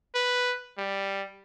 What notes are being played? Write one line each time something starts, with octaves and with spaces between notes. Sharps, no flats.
B4
G3